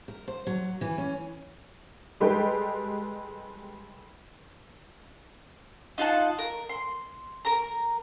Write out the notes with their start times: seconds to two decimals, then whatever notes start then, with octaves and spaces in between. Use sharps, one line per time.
0.08 A#4
0.28 C5
0.47 F#3
0.81 E3
0.98 C#4
2.20 G3 G#3 A4 B4 G5
5.98 D#4 F4 F#5 A5
6.39 A#4
6.69 C6
7.45 A#4 A#5